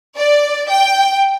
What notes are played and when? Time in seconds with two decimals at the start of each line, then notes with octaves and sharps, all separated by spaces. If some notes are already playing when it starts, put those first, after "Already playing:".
0.16 D5
0.69 G5